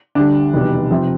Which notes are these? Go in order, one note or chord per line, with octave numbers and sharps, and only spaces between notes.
D2 D3 G3 D4
F1 E2 B2 G3
C3 F3